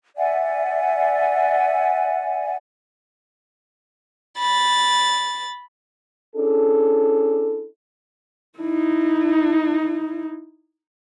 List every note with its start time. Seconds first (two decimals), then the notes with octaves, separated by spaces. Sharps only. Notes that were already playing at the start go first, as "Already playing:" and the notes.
0.17 D5 E5 F#5 G#5
4.38 B5 A6
6.35 C#4 D4 E4 G#4 A4
8.59 D#4 E4